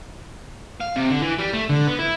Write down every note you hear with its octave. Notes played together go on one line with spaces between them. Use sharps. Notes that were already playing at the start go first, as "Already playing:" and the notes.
F5
C3
D3
E3
G3
A3
D3
B3
E4